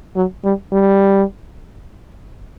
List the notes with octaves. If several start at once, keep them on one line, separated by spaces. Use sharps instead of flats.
F#3
G3
G3